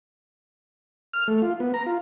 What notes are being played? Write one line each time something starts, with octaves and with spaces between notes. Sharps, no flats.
F6
A3
F4
B3
A#5
F4